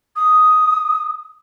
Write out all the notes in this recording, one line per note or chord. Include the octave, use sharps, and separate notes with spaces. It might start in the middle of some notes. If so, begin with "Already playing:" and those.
D#6